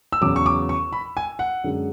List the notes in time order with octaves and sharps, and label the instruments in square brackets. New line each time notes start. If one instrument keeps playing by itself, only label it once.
[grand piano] E6
E2 C#3 F#3 D6
C#6
D6
C#6
B5
G#5
F#5
F#2 D3 G#3